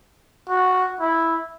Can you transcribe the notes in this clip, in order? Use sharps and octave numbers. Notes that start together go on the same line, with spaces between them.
F#4
E4